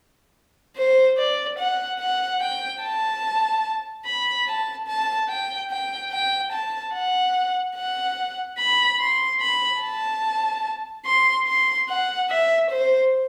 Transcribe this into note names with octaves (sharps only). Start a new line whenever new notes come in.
C5
D5
F#5
F#5
G5
A5
B5
A5
A5
G5
G5
G5
A5
F#5
F#5
B5
C6
B5
A5
C6
C6
F#5
E5
C5